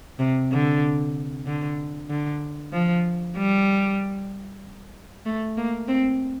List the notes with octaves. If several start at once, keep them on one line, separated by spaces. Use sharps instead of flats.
C3
D3
D3
D3
F3
G3
A3
A#3
C4